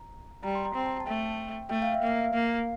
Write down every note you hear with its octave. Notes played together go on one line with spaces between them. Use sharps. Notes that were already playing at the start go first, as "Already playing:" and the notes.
Already playing: A#5
G3 A#5
C6
A#5
C4
A5
A5
A3 G5
A3 G5
F5
E5
A#3 F5
A#3